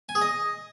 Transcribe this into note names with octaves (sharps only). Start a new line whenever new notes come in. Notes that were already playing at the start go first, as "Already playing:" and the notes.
G#5
G#4
D#5